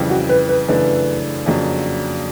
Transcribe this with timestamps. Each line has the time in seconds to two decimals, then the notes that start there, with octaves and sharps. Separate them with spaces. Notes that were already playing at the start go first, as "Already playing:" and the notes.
Already playing: F2 C#3 E3 G3
0.10 F#4
0.29 B4
0.48 B4
0.68 F#2 C#3 E3 A3 D4 B4
1.46 F2 C#3 F#3 A#3 D4